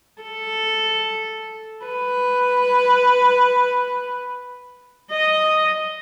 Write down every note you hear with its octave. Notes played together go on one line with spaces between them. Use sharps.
A4
B4
D#5